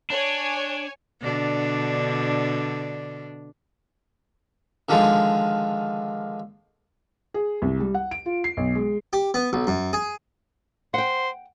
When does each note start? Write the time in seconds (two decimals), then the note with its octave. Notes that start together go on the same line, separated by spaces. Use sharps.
0.10 D4 C#5 G#5
1.21 B2 D3 D4
4.89 D3 D#3 F3 G#3
7.34 G#4
7.62 C2
7.80 G3
7.94 F#5
8.11 D7
8.26 F4
8.44 C7
8.57 B1
8.75 G#3
9.13 G4
9.34 B3
9.53 B1
9.67 F#2
9.93 G#4
10.94 C5 F#5 G5